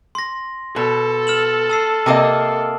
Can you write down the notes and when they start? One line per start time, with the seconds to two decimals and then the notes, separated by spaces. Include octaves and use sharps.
0.15 C6 A#6
0.76 B2 A4
1.27 F6 E7 F#7
1.69 A5 E6 C7
2.06 C3 A#3 D#5 A5 D#6